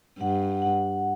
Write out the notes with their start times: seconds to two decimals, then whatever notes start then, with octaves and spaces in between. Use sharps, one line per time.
0.20 G2 F#5
0.62 F#5